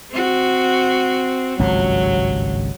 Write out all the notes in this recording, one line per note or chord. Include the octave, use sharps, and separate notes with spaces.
C4 F#4
G#1 C#2 G2 F#3